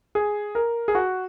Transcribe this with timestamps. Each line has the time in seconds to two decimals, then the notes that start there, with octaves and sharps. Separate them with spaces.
0.15 G#4
0.55 A#4
0.88 G#4
0.95 F#4